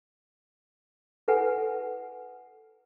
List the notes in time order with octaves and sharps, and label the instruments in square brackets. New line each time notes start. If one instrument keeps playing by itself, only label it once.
[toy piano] E4 A4 B4 F#5 G#5